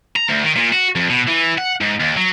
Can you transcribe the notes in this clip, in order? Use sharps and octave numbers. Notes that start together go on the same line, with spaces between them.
A#5
D2
D#3
A#2
F#4
F2
B2
E3
F#5
G#2
D#2
F#3